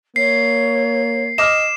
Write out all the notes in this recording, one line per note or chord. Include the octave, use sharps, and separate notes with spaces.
A#3 C#5 C7
D#5 D6 F6 E7